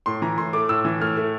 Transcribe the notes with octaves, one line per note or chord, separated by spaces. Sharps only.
A2 C6
E3 A#5
A2 C6
A3 D6
A2 E6
E3
A2 F6
A3